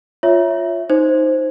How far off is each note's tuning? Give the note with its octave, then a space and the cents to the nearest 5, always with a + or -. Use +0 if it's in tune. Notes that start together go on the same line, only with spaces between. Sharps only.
F4 +0 C#5 +0 E5 +0
D#4 +10 C5 +0